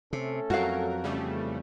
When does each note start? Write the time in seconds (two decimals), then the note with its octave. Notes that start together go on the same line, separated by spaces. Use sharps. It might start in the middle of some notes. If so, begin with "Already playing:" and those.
0.13 C3 A3 C#4 A4
0.50 F2 F#3 F#4 A#4 F5
1.04 E2 C#3 G3 A3